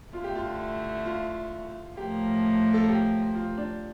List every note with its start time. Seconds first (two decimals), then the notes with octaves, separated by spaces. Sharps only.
0.13 G2 D3 A3 E4 F4
0.24 G4
0.35 F4
1.05 F4
1.97 A2 F3 A#3 G4
2.74 A4
2.89 G4
3.35 F4
3.58 D4